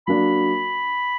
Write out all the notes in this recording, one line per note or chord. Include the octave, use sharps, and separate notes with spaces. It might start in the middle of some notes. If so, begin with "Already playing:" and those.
F#3 A#3 D4 B5